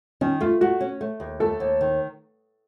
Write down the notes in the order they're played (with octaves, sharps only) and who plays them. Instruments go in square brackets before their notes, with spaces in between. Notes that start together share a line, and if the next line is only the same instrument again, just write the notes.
[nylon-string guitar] D#3 [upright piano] C#4
[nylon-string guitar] A3 [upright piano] F4
[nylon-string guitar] A3 [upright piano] F#4
[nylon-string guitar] C#4
A3
D#2
[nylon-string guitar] A3 [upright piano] A4
[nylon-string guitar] D#2
D#3